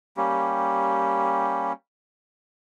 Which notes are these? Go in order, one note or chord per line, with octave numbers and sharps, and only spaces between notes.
G3 A#3 C#4 G4